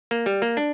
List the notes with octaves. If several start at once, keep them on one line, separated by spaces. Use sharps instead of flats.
A#3
G3
A#3
D4